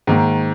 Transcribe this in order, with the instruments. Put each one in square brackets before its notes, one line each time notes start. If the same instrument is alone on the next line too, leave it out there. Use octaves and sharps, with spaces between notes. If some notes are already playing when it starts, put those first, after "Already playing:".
[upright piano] G#2 D#3 A#3